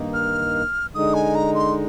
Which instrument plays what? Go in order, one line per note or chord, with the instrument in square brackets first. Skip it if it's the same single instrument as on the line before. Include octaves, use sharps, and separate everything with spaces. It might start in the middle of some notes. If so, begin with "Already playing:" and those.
Already playing: [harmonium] G2 D#3 A#3 D#4
[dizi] F6
[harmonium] D3 G#3 D#4 [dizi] D#6
[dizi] G#5
A#5
C6